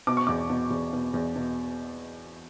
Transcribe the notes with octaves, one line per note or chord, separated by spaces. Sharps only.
B2 D6
C#6
E2 D6
B2
E2
B2
E2
B2